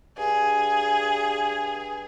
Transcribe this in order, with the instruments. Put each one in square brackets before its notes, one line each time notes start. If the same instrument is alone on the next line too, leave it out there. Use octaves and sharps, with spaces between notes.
[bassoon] G2 [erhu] G#4